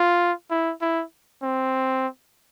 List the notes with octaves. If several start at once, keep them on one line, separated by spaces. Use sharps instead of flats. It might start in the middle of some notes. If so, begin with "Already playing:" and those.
Already playing: F4
E4
E4
C4